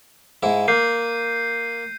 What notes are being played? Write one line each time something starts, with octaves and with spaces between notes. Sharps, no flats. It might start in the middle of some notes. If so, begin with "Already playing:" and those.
G#2 E4
A#3 G6 C7 D#7